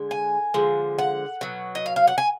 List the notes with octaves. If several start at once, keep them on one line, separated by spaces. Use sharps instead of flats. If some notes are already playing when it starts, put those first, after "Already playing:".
Already playing: D3 G#3
G#5
D3 F3 G#3
F#5
B2 F#3
D#5
F5
F5
F#5
G#5